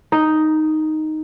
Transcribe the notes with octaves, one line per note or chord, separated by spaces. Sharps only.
D#4